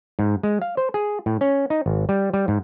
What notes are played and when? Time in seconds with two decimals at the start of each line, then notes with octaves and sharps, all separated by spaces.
0.19 G#2
0.43 G#3
0.62 F5
0.77 C5
0.94 G#4
1.26 A2
1.41 C#4
1.70 D#4
1.86 G#1
2.09 G3
2.33 G3
2.48 G#2